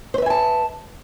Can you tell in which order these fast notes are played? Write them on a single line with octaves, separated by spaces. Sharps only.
C5 B4 E5 G#5 A5